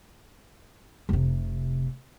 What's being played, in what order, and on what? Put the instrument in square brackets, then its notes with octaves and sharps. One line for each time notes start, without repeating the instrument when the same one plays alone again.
[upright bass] F1 C3